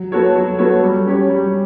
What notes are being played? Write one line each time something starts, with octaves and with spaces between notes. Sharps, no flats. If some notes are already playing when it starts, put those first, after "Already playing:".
Already playing: F#3
B3 F#4 A4 C#5
F#3
B3 F#4 A4 C#5
G3
C#4 G4 C#5
G3